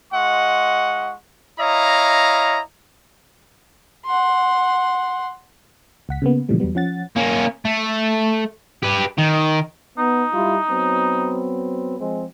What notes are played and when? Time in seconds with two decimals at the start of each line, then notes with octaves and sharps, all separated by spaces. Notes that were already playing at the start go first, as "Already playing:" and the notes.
0.13 G#3 F4 D#5 F#5 C#6
1.59 E4 C#5 D#5 F5 A#5
4.06 F#5 C6
6.09 C#2 F#5 B6
6.22 C#3 A#3 B3
6.48 A#2 C#3 E3 F3 G3 A3
6.60 E2 F#3 G3 B3
6.75 F3 C#4 F#5 A6
7.17 A#3 C#4
7.65 A3
8.83 G4 B4
9.18 D#3
9.98 B3 D#4
10.33 G3 E4 F4
10.69 F#3 B3 C4
11.98 F3 G#3 C4